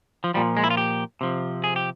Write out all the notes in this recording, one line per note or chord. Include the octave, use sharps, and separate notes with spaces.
F3
A#2 F3 G3
G#3
E4
F4
G4
C3 F3
G#4
G4